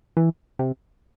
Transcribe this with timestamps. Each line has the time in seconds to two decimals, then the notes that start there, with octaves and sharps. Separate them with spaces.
0.17 E3
0.59 C3